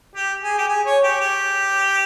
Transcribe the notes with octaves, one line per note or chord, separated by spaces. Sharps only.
G4
G#4
G4
G#4
C#5
G4
G4